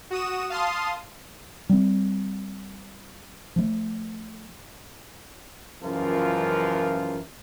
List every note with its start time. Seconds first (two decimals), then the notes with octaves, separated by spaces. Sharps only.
0.10 F#4 D#6 E7
0.50 F5 A5 C6 D#6
1.69 G3 C4
3.56 F3 A3
5.82 C#2 F#2 E3 F3 F4 A#4